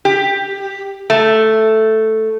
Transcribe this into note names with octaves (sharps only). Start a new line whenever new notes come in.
G4
A3